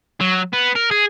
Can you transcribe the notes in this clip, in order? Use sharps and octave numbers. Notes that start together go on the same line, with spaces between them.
F#3
B3
A#4
G#4